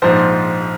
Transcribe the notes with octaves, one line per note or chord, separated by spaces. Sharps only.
A#1 G#2 F3 C5